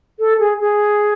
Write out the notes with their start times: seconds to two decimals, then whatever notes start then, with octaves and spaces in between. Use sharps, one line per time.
0.19 A4
0.39 G#4
0.60 G#4